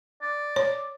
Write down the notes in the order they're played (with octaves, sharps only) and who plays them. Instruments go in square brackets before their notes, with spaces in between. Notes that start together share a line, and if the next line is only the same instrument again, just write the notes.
[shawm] D5
[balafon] C#5